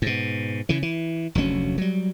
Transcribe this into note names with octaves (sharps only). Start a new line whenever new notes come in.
G#2 B2
C#3 E3
E3
F1 D2 F#3 C#4
F#3 G3